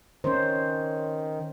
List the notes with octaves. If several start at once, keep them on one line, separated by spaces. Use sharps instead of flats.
D#3 C#4 C5